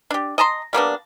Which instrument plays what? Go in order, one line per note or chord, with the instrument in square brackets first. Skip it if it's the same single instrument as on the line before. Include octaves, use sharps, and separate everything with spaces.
[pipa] D4 G4
D#5 A5 A#5 C6
G3 A#3 B3 D4